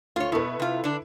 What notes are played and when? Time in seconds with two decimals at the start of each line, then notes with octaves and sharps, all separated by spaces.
0.16 D2 F4 C#5
0.32 B2 B3 E4 A4 B4
0.60 C3 F4
0.84 D3 D4